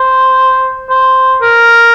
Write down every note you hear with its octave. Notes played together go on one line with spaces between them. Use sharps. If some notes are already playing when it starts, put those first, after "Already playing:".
Already playing: C5
C5
A#4